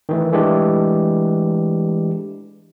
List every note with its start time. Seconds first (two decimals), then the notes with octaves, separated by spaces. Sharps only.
0.09 D#3 E3 A3
0.33 E3 G#3 A3 D4 G4